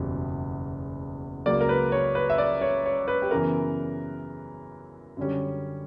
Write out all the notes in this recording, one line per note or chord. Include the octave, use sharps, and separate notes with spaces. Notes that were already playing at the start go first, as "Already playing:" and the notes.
Already playing: F#1 E2 B2 G3
C#2 C#3 F#3 A#3 D5
A#4
B4
C#5
B4
E5
D5
C#5
C#5
B4
G4
F#2 C#3 E3 B3 A#4
F#2 D3 G3 C#4